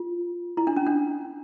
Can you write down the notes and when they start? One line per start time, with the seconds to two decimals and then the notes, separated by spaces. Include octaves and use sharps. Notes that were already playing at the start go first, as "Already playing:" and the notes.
Already playing: F4
0.57 E4
0.67 D4
0.77 C#4
0.87 D4